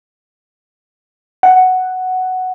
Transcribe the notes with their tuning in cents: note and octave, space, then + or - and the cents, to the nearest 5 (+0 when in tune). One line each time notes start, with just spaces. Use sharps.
F#5 +5